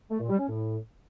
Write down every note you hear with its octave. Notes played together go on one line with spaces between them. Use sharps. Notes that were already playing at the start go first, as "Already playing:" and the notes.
A3
A#2
G3
C#4
A2